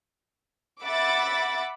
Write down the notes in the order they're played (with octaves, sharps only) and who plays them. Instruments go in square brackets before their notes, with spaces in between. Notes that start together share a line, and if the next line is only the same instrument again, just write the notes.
[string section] E5 F#5 B5 D6 A6